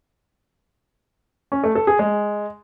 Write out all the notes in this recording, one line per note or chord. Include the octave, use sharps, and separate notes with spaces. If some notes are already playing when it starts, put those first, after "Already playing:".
C#4
A3
A4
G#4
G#3